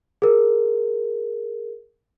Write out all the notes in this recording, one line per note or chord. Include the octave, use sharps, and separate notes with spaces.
G#4 A#4